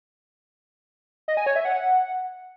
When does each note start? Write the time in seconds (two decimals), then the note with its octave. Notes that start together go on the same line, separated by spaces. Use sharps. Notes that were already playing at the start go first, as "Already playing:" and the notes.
1.28 D#5
1.37 G#5
1.46 C#5
1.56 E5
1.65 F#5